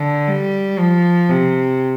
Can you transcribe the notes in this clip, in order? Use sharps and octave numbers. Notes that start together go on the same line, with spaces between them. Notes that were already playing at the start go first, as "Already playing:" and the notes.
Already playing: D3
G3
F3
C3